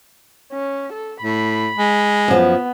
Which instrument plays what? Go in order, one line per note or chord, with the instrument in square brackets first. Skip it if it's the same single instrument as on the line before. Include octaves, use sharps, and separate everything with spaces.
[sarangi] C#4
A4
[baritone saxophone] A2 [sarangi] B5
[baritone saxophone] G#3
[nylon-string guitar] F#2 F3 [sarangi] B3